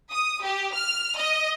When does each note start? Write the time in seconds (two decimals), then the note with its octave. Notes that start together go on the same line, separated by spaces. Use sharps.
0.11 D#6
0.42 G4
0.73 F6
1.17 D#5